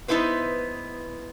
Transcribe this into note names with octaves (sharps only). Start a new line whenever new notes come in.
B3 D#4 E4 B4 C5